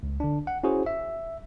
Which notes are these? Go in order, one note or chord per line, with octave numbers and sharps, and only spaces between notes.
C#2
D3 D4
F#5
C#4 E4 F#4 G#4 C5
E5